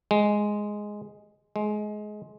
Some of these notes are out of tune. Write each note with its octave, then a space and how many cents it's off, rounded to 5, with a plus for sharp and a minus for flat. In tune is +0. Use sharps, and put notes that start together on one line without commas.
G#3 +0
G#3 +20